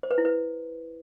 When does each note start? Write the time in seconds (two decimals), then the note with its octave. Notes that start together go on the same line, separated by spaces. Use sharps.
0.03 C5
0.11 B4
0.18 E4
0.25 B4